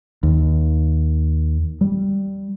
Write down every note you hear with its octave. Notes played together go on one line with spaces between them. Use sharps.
D#2
G3